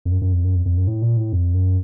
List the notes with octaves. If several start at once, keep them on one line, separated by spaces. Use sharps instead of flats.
F2
F#2
F#2
F2
F#2
F2
F2
F#2
A2
A#2
A2
F2
F#2